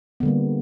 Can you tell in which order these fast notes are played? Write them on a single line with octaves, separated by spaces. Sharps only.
B3 D3 G3 A#3